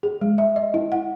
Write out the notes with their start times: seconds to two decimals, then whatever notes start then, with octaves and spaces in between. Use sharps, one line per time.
0.03 G#4
0.21 G#3
0.38 E5
0.56 D#5
0.74 E4
0.92 F#5